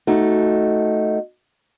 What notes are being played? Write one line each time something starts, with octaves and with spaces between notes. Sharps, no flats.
A3 D#4 F#4